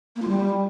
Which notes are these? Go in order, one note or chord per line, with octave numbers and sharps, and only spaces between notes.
A#3
F4
G3